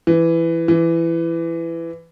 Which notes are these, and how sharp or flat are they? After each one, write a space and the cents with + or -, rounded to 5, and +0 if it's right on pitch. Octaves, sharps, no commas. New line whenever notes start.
E3 +10
E3 +15